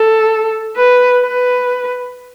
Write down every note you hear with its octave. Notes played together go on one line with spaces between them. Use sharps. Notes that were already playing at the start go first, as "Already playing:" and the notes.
Already playing: A4
B4
B4